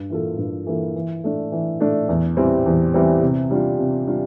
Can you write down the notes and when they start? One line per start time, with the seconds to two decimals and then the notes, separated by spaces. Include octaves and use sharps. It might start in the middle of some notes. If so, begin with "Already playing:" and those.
Already playing: G2
0.10 E3 A#3 F4 A4
0.38 G2
0.67 E3 A#3 F4 A4
0.96 E3
1.24 A3 D4
1.52 E3
1.80 A3 D4
2.09 E2
2.37 E3 G3 C4
2.66 E2
2.94 E3 G3 C4
3.22 C3
3.51 G3 D4 F4
3.78 C3
4.08 G3 D4 F4